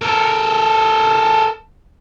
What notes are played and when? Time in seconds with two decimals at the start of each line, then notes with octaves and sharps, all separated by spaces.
0.02 A4 A#4